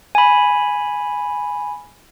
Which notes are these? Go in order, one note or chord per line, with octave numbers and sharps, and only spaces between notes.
G#5 B5